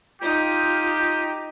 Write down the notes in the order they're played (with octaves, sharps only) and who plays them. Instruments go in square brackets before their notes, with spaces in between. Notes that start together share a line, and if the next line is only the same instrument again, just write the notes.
[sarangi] D#4 [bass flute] F4 [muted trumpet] G4 [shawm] G5